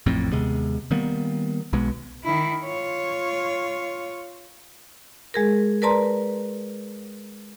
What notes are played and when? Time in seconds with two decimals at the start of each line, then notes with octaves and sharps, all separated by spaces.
0.06 A1 F2 A2 C4
0.32 D#2 C3 G#3 B3
0.91 D#3 G3 A#3 B3
1.73 B1 B2 G#3 B3
2.24 D#3 E4
2.64 F4 C#5
5.34 G#3 G#4 A#4
5.82 A#4 B4 D5 A5 A#5 C6